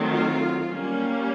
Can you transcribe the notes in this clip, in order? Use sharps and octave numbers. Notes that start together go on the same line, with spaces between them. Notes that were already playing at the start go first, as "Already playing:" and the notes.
Already playing: D#3 F#3 A3 C4
F4
G3 A#3 C#4